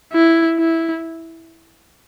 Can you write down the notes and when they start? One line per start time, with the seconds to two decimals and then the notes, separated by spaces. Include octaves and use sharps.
0.13 E4
0.58 E4